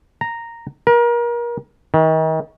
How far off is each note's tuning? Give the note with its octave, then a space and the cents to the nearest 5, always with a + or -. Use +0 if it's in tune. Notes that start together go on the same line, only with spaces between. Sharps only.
A#5 -5
A#4 +35
D#3 +35